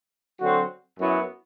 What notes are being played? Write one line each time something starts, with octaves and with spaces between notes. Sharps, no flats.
D3 F#3 C4 F#4
F#2 F#3 B3 E4